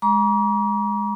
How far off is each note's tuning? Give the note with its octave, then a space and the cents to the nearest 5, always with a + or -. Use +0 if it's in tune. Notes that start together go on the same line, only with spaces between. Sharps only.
G#3 +0 A#5 +35 D6 -40